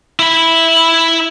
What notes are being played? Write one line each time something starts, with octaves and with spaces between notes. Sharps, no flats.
E4 B5